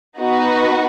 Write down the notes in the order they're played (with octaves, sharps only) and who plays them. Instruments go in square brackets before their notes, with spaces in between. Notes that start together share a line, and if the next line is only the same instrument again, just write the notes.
[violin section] B3 D#4 F#4 B4